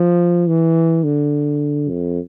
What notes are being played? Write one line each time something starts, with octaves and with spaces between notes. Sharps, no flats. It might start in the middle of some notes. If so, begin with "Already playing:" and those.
Already playing: F3
E3
D3
F2